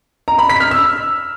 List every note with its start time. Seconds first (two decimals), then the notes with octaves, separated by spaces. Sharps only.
0.28 A#5
0.39 B5
0.50 B6
0.60 F6
0.71 E6